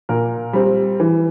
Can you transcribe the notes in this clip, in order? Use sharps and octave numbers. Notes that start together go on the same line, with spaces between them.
A#2 A#4
G3 C4
E3